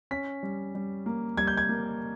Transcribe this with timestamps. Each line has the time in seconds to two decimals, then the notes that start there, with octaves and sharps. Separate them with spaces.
0.11 C#4 B6
0.43 G3
0.75 G3
1.06 A#3
1.37 G3 G#6
1.47 G6
1.57 G#6
1.69 A#3